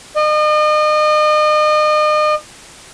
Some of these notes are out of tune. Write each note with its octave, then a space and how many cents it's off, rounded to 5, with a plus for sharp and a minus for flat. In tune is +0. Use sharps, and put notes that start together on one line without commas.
D#5 -40